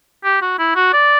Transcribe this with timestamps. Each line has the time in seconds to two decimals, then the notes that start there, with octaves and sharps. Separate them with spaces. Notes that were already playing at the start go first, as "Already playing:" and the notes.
0.24 G4
0.42 F#4
0.59 E4
0.76 F#4
0.93 D5